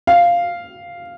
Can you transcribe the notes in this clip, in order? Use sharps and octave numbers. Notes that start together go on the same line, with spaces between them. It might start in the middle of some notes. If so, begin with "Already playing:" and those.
F5